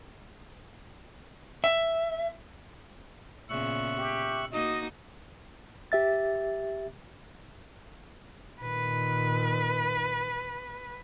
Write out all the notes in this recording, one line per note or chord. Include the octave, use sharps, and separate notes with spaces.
E5
A#2 C#3 B3 E5 C#6 F#6
G4
A#3 D#4 F#4 D#5
G4 E5 A6
A#2 D#3 B4